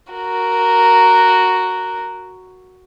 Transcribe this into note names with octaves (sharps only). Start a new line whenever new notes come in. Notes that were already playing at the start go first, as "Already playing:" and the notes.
F#4 A#4